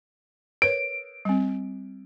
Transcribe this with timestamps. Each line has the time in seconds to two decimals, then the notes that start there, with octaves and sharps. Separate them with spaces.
0.62 A#4 B4 C#5 D7
1.25 G3 C4